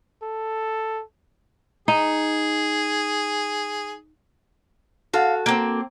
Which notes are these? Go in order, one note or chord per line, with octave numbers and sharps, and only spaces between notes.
A4
D#4 G#4
F#4 A4 F5
A#3 C4